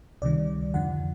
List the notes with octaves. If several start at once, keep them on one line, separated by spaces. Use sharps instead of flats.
C#2 C3 D#3 G3 D5
F2 D3 F3 F#5